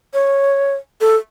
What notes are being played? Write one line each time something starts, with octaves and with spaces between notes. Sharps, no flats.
C#5
A4